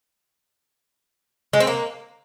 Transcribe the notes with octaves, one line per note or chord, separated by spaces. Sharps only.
G#3
C4
A#3